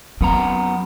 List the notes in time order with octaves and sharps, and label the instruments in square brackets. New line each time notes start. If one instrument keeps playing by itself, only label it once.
[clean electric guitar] F#2 B3 A#5 [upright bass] C4